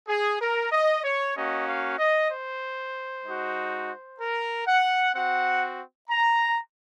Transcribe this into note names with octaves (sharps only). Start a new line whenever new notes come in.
G#4
A#4
D#5
C#5
A#3 C#4 F#4 D#5
F5
D#5
C5
G#3 D#4 F#4
A#4
F#5
C4 F#4 F#5
A#5